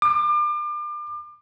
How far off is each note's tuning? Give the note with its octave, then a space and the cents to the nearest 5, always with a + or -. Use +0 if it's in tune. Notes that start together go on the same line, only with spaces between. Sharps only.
D6 +35